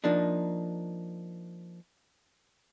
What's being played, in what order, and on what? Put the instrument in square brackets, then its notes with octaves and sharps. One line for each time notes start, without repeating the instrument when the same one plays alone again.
[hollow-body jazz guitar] F3 A#3 D4 D#4